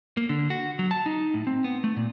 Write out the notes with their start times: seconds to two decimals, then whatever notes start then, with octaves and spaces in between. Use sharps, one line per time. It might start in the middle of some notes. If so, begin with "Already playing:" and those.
0.17 A#3
0.29 D3
0.50 F#4
0.79 F#3
0.91 A5
1.06 D#4
1.34 A2
1.47 C4
1.64 B3
1.84 A3
1.97 A#2